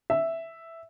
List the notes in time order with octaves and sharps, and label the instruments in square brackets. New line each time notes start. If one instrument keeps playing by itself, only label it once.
[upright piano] E5